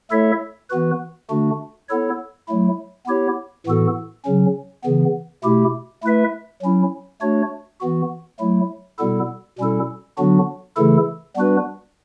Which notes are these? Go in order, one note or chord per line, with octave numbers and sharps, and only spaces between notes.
A3 E4 A4 C#5 E5
E3 B3 F#4 B4
D3 A3 D4 F#4
B3 E4 A4 C#5
F#3 A3 E4
B3 E4 G4 C#5
A2 E3 B3 F#4 A4
C#3 F#3 C#4
C#3 E3 B3
B2 A3 E4 G4
A3 E4 B4 E5
F#3 C#4 E4
A3 D4 F#4 C#5
E3 B3 F#4
F#3 A3 E4
B2 G3 B3 E4 A4
B2 G3 C#4 E4 A4
D3 F#3 B3 D4 F#4
C#3 E3 A3 E4 A4
G3 B3 D4 F#4 B4